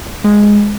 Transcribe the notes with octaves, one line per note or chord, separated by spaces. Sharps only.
G#3